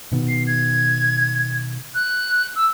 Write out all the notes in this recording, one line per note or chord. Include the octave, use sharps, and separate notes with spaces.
B2 D#3 B3
C7
G#6
F#6
E6